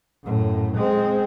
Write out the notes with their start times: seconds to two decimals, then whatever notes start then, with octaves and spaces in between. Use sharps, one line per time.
0.23 F#2 A2
0.77 G#3 C4